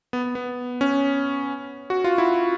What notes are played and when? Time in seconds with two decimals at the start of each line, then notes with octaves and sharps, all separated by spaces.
0.13 B3
0.35 B3
0.81 C#4
1.90 F#4
2.04 F4
2.18 E4